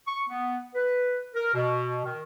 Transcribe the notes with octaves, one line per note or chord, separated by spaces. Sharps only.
C#6
B3
B4
A#4
B2
D#3